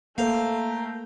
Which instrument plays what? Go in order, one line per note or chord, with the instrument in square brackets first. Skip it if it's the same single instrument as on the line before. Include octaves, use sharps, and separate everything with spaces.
[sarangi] A3 [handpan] A#3 A4 C5 [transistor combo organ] A#4 G5 [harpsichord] F5